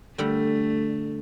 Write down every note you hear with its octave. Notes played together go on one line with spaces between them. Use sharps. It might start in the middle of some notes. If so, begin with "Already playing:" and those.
D3 G3 A3